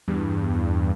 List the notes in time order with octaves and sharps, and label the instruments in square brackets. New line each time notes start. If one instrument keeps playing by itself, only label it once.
[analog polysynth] E2 G2